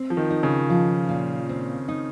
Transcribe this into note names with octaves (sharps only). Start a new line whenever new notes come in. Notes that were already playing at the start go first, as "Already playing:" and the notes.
Already playing: C4
F3
D#3
D#4
C#3
F3
A#2
C4
D#4